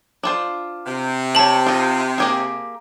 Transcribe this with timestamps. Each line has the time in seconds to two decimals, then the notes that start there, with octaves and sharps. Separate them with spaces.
0.23 D4 F4 C5
0.86 C3
1.35 C4 C#5 A5 F#7
1.66 D#4 F4
2.18 A#3 G4 G#4